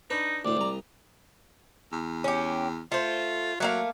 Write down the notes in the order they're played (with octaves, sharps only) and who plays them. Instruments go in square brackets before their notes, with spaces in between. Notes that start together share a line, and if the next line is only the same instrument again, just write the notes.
[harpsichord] D4 B4 [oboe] D#4
[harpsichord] D2 A2 [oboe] D5
[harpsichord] C2 A#5
[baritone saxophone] E2
[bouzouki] C#4 G4
[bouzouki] A3 C5 [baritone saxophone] F4
[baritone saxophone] F#3 [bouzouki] A3 A#3 F5